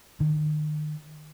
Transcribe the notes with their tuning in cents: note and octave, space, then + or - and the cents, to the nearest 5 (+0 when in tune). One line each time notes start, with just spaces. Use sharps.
D#3 -40